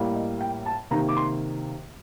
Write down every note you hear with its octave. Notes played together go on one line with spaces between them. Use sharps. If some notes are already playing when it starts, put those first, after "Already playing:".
Already playing: A2 G3 A#3
D#5
G5
A5
C3 D#3 A#3 A#5
D6
C6